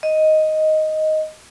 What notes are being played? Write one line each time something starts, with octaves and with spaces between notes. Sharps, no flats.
D#5